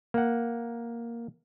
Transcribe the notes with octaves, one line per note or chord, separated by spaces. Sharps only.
A#3 F#5